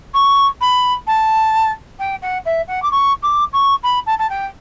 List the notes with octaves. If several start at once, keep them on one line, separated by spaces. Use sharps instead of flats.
C#6
B5
A5
G5
F#5
E5
F#5
D6
C#6
D6
C#6
B5
A5
A5
G5